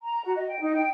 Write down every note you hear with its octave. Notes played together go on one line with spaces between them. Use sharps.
A#5
F#4
D#5
G5
D#4
G5